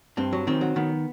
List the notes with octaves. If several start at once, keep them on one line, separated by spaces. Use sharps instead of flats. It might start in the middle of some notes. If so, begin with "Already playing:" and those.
G2 C4
F#3
D#3 C4
F#3
D#3 B3